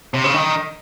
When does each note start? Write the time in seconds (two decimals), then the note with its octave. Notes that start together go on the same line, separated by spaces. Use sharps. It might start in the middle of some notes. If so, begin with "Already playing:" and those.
0.14 C3
0.24 C#3
0.34 D#3